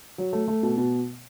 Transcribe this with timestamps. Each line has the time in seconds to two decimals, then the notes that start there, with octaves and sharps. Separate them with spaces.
0.18 F#3
0.33 A3
0.48 A3
0.63 B2
0.77 B2